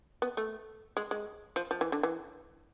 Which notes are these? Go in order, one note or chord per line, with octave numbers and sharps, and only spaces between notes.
B3
A3
G#3
G#3
F3
F3
E3
D3
E3